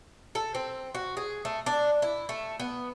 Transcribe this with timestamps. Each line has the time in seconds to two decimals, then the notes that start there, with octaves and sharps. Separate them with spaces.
0.35 A4
0.55 C4
0.95 F#4
1.17 G#4
1.45 A3
1.66 D4
2.02 E4
2.29 A3
2.60 B3